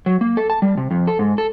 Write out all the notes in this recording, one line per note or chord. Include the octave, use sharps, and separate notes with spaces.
F#3
A#3
A4
A5
G3
C3
F2
A4
G#2
A4